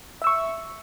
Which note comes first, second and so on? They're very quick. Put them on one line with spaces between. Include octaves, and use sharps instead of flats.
E5 E6 C#6